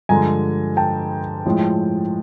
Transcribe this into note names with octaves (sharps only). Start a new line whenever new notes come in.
G2 D3 F3 G#3 G#5 A#5
G5 A5
A2 F3 G#3